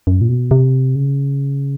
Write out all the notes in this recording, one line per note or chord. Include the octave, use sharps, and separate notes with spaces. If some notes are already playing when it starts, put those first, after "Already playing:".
F#2
A#2
B2
C3
C#3